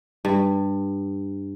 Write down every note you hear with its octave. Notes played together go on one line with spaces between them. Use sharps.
G2